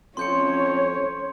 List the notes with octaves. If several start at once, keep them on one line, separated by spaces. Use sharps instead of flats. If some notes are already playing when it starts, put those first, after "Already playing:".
F2 C#4 C#5 C6 G6 C#7